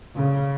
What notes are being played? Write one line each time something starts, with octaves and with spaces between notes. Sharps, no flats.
C#3